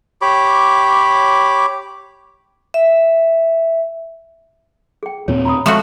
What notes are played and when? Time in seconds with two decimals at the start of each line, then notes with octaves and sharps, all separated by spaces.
0.22 G4 C#5 B5 D6
2.74 E5
5.03 G#4 G5
5.28 D#2 A#2 C4 C#5
5.45 A#5 B5 D#6
5.66 F3 G#3 A3 F#4 C#6